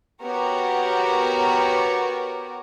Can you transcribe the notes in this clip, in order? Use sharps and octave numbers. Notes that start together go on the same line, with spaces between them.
B3 F#4 G4 A#4 C#5